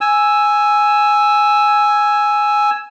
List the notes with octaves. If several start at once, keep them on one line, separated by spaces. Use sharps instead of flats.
G#5 E6